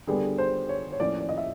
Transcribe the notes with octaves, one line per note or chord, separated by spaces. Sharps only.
D3 G3 B3 G#4
C5
C#5
C#5
A2 F3 A#3 C#4 D5
D5
D#5
E5